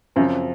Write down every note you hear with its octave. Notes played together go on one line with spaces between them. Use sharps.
F#2 C#3 F3 C4 F4 C5